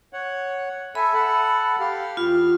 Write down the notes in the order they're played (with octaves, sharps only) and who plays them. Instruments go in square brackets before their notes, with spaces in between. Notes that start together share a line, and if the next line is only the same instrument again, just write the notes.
[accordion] C#5 F#5
[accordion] A4 E5 G#5 [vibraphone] B5
[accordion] A4 F#5 A5
G4 F5
[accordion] E2 F6 [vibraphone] F4